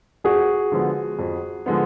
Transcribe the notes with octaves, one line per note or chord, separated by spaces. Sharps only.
F2 F#4 G#4
D3 F3 G#3 B3
F2
D3 F3 G#3 B3